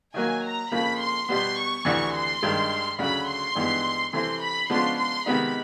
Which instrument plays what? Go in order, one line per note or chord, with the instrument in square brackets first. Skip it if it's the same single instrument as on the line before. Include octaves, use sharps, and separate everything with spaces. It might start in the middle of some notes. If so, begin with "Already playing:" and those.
[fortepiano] D#3 F#3 A#3 [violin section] G#5
[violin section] A#5
[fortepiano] F2 C#3 F3 A#3 [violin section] B5
[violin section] C6
[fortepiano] B2 G3 B3 [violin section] C6
[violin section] C#6
[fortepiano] D2 C3 E3 [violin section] C#6
[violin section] C6
[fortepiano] G2 D#3 G#3
[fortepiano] D2 C#3 F#3 [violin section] B5
[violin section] C6
[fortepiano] G2 E3 G#3 B3 D#4
[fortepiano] C3 E3 A3 C4 E4 [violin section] C6
[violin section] B5
[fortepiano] C#3 F3 G#3 B3 D4 [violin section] C6
[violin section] C6
[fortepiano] C3 D#3 G#3 B3 D#4 [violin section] B5